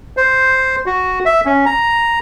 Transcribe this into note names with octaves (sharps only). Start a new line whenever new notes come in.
C5
F#4
E5
C#4
A#5